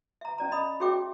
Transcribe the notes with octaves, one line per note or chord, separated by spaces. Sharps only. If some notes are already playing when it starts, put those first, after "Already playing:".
E5 A#5
C#4 D5 A#5
D#5 B5 D#6
F#4 G#4 C#5 E5 G5 D6